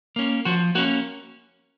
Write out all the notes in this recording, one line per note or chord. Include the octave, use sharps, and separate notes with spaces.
A#3 C#4
F3 F#4
A#3 C#4 F#4